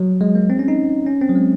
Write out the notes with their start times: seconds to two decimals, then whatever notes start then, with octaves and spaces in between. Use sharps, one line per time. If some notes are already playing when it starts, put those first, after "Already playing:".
Already playing: F#3
0.21 G#3
0.35 A#3
0.50 C4
0.59 C#4
0.68 D#4
1.07 C#4
1.21 C4
1.29 F#3
1.35 G#3